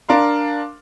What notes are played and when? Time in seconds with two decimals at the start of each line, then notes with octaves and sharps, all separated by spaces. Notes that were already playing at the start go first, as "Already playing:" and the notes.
0.09 D4 A#4 F5 C6